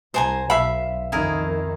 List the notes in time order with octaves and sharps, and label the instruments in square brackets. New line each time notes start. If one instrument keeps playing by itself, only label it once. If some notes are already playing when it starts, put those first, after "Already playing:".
[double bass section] C2 [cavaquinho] C5 G#5 A#5
[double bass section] B1 [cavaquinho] E5 B5 [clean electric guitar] F5
[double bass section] F2 D#3 [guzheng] E4 G#4 A#4